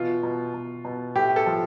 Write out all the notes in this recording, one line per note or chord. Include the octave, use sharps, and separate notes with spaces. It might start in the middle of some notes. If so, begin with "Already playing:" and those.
Already playing: B2 E3 F4
B2
B2
B2
A2 G4
A4
F3